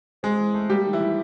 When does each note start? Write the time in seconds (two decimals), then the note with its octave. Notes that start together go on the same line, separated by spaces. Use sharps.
0.23 G#3 C4 G#4
0.38 E3
0.54 A3
0.70 G3 A#3 G4
0.86 D#3
0.93 E3 E4
1.01 G3